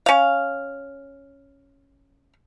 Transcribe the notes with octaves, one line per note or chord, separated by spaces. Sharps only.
C#4 F5